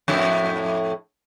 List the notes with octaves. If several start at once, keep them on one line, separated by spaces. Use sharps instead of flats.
F2 A2 E4